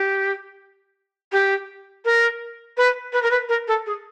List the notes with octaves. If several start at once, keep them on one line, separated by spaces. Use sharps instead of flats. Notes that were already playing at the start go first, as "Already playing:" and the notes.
Already playing: G4
G4
A#4
B4
B4
A#4
B4
A#4
A4
G#4